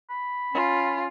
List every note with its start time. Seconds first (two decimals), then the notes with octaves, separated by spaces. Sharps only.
0.10 B5
0.53 C#4 F4